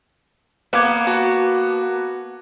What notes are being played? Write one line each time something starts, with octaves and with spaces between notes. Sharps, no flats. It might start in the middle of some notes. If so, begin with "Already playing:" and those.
A#3 B3 F#5 D6 G#6
F#4 A5